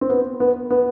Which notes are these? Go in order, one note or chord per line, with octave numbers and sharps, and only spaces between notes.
C4
B3
B3
B3